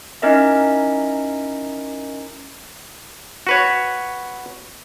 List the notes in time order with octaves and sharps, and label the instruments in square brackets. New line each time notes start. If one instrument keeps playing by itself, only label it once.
[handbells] C#4 D#4 E4 A#4 D#5 E5
[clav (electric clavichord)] F#4 B4 C#5